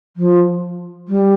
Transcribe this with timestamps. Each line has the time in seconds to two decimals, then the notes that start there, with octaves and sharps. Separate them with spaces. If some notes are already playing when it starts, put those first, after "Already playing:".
0.17 F3
1.08 G3